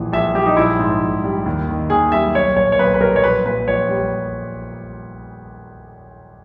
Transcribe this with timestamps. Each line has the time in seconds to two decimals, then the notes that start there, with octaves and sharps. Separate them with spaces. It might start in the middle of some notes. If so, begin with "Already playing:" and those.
Already playing: A#1 A#2 E3
0.12 A#1 E5
0.34 G3 G4
0.46 D#4
0.57 A#1 E4
0.79 G#2
1.02 A#1
1.24 G3
1.46 D#2
1.68 D#3
1.90 D#2 G#4
2.12 G3 E5
2.35 B1 C#5
2.56 A#2 C#5
2.72 C#5
2.79 B1 B4
2.94 B4
3.00 G3 A#4
3.16 C#5
3.23 A#1 B4
3.46 A#2 B4
3.67 A#1 C#5
3.89 G3